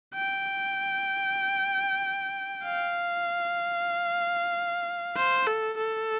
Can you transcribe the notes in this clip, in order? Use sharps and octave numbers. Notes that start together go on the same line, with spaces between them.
G5
F5
C5
A4
A4